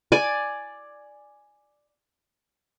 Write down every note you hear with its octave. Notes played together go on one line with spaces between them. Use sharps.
D5 G#5